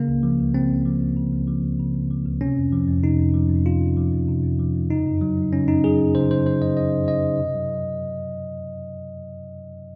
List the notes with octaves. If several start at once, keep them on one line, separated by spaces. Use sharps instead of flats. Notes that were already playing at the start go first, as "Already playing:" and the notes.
Already playing: C#3 A#3
C#2
F3
C#2
C#3 C4
C#2
F3
C#2
C#3
C#2
F3
C#2
C#3
C#2
F3
C#2
C3 C#4
F2
F3
F2
C3 D#4
F2
F3
F2
C3 F4
F2
F3
F2
C3
F2
F3
F2
C#3 D#4
F#2
F#3
F#2
C#3 C#4
F#2 D#4
F#3 G#4
F#2
C#3 C5
F#2 C5
F#3 C5
F#2 D#5
C#3 D#5
F#2
F#3 D#5
F#2
C3
F#3